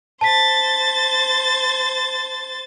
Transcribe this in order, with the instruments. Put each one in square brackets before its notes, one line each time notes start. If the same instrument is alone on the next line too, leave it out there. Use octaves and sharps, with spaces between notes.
[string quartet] C5 A6 [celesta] A5 B6